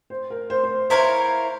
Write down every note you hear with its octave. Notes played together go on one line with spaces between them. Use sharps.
C5
A#4
C5
C5
E4 A#4 C5 C#5 F5